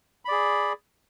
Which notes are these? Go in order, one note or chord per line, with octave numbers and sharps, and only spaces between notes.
G#4 D5 B5